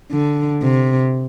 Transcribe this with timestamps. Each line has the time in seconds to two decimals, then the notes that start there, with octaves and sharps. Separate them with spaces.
0.12 D3
0.63 C3